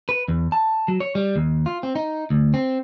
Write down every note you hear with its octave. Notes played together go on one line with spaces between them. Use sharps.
B4
E2
A5
F#3
C#5
G3
D#2
F4
C4
D#4
D2
C4